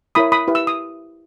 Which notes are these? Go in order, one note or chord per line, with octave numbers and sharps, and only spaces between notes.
E4 A#4 C#5 B5 D#6
B5 D#6
E4 G4 B4
E6
D#6